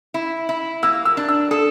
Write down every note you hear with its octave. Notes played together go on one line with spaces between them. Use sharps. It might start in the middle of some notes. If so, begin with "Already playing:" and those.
E4
E4
A#3 E6
E6
D4
E6
A4 D#6